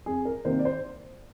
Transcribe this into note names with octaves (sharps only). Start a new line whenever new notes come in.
F2 G#4
A#4
C3 D#3 A#3 C5
D5
C5